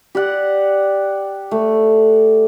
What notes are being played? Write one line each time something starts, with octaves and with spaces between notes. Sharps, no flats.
G4 D5 F#5
A3